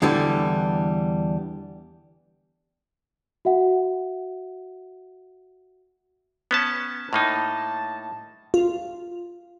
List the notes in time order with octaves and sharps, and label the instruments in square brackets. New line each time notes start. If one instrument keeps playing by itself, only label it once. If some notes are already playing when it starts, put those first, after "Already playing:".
[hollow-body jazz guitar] E2 D3 E3 G3 A4
[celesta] F#4 E5 F#5
[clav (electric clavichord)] B3 C#4 A5
[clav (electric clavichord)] A2 A#3 D#4 [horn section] A5
[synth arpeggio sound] F4